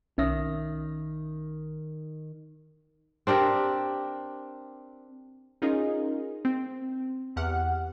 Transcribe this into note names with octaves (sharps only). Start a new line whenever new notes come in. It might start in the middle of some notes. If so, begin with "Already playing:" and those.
B1 D#3 C#4 E5 A#6
C4 D4 G4 A#4
C#4 D#4 F4 G#4 A#4 D#5
C4
E2 G4 F#5 F6